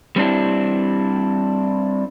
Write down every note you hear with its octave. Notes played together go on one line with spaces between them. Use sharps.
G3 C4 D4 E4